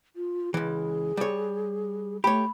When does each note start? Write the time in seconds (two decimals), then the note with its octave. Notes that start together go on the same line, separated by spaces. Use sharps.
0.16 F4
0.54 C#2 E3 G#4
1.17 G3 C#5
2.24 A3 G4 C#5 B5